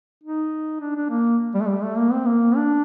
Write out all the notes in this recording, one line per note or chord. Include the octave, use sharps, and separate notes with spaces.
D#4
D4
D4
A#3
G3
A3
G3
A3
A#3
C4
A#3
D4